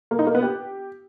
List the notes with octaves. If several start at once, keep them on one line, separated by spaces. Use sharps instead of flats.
A#3
D#4
A#3
B3
G4